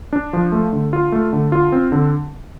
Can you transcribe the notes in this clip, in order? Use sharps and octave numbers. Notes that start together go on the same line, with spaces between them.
D4
F3
A3
D3
F4
A3
D3
F4
C4
D3